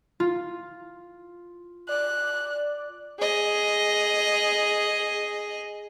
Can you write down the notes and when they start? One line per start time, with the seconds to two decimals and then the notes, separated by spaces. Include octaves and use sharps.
0.20 F4
1.89 D5 F#6
3.19 G#4 D#5